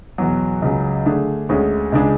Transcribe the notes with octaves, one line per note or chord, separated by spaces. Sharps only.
E2 B2 F#3
C#2 C#3 F#3
D3 A3 D4 G#4
D2 D3 G#3 C#4 G#4
C#2 C#3 G#3 D4 G#4